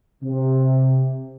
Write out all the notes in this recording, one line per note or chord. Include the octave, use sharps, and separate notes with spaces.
C3